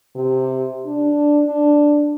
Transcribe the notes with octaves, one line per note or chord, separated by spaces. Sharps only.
C3
D4
D4